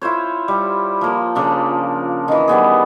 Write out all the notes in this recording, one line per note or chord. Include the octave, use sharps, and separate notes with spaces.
E4 F4 C5 C#5
G3
F3 A#3
C#3 F3 D4
D#3 E3
G3 B3 G#4